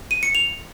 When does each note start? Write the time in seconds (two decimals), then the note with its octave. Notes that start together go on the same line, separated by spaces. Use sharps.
0.11 D#7
0.23 C#7
0.35 F7